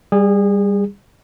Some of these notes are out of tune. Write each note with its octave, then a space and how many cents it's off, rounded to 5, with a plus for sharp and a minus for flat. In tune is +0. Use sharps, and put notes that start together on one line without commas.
G3 +15 G#4 -25